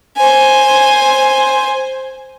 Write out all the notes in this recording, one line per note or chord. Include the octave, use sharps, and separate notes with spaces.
C5 G#5